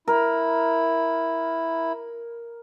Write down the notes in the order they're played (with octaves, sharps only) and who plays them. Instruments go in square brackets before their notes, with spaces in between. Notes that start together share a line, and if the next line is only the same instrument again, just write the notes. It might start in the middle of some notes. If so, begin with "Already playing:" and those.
[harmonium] E4 [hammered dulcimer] A#4